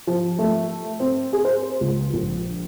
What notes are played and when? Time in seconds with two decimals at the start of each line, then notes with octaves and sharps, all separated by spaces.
0.07 F3
0.39 A3
1.00 C4
1.33 G#4
1.45 C5
1.81 C#2
2.14 A#1